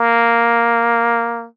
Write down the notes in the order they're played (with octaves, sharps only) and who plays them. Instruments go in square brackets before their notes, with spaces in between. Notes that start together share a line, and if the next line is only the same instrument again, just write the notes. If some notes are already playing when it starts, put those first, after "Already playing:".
Already playing: [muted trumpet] A#3